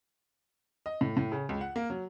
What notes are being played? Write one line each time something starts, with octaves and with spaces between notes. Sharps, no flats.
D#5
A2
A2
C#3
C#2
F#5
A#3
F#3